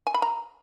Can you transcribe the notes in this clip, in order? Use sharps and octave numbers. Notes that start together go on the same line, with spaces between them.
G#5
B5
A#5